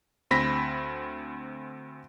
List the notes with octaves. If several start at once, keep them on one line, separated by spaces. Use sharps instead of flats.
D2 C4 B5 A#6 B6